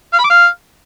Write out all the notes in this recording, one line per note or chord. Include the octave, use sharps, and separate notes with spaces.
F5
B5
D6
F5